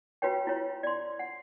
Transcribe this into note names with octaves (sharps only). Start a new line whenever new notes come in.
F4 F#4 B4 C#5 G5
E4 F4 C#5
D5 C6
F#5